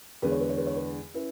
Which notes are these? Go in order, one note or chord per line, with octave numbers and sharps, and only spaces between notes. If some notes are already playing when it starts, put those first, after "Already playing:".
E2 D3 G#3 B4
C#5
B4
C#5
B4
C#5
B4
C#4 E4 B4